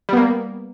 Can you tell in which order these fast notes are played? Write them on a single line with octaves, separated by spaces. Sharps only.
G3 B3 A#3